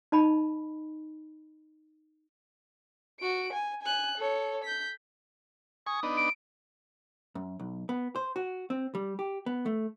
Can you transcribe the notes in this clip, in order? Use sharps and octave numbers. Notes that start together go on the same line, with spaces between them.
D#4 D#5 A5 B5
F#4 D7
G#5
G#5 F#6
A4 C#5
G6 B6
G#5 C#6 D#6
B3 D4 D#4
D7
F#2
B1
B3
C5
F#4
C4
G3
G4
B3
A3